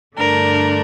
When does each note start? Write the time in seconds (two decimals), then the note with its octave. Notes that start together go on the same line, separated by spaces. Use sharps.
0.17 G2 D3 A3 D4 A#4